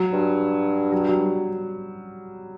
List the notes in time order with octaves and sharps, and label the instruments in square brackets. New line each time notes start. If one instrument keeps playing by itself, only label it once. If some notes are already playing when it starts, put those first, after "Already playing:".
Already playing: [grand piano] F#3
[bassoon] G2
[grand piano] F#3
G3
F#3